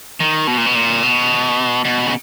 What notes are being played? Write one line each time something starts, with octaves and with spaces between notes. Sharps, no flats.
D#3
B2
A#2
B2
A#2
B2
B2
C#3